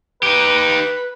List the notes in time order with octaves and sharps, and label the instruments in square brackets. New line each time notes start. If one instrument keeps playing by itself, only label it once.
[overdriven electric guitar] D#4 G4 [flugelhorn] B4